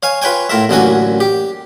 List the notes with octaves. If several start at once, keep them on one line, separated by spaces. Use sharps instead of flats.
C#5 F5 G#5
F4 B4 C#5 G5 G#5
A2 F4 A#4 E5
A1 F#2 D3 A#3 F#4 G#5
G4